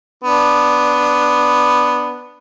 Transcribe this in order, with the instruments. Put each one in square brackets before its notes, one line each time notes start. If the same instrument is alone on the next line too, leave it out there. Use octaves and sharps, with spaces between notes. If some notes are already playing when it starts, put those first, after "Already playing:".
[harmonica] B3 D4